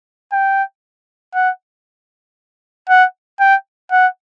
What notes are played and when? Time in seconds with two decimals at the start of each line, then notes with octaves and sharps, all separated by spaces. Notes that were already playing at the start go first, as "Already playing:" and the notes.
0.32 G5
1.35 F#5
2.89 F#5
3.40 G5
3.91 F#5